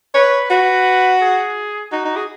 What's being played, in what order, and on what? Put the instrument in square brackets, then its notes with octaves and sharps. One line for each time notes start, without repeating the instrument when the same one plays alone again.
[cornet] B4 [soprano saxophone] C#5
[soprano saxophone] F#4 [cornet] B4
[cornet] G#4
[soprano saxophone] D#4 [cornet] F#4
[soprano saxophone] D#4
G#4